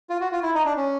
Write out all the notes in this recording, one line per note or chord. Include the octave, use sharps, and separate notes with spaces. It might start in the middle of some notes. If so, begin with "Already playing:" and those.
F4
F#4
F4
E4
D#4
D4
C#4